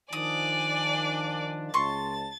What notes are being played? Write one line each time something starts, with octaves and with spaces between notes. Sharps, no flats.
D#3 F3 D4 D5 G#5 D#6
C#2 A5 C6 C#6 A6